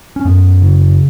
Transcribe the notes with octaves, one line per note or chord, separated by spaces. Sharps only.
C#4
F#2 B3
C#3